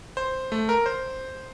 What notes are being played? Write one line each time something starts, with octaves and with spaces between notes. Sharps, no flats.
C5
A3
A#4
C5